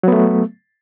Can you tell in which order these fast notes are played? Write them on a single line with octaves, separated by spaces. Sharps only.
F#3 B3 A3